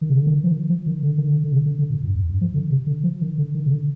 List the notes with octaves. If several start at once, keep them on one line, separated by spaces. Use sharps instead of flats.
D#3
C3
D3
D#3
F3
D#3
F3
D#3
D3
D#3
D3
D3
C3
D3
D3
A#2
G2
F2
G2
F3
D3
C3
D3
F3
D#3
D3
D#3
C3
D3